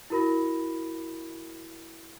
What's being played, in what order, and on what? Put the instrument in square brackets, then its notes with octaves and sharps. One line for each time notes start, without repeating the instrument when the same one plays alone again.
[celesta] E4 F#4 A#4 B5 A#6